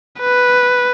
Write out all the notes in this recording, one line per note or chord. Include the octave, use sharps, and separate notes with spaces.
B4